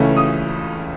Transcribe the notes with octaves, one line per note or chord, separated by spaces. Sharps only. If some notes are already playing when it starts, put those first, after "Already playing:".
Already playing: C#2 C#3 E3 A3 C#4
D#6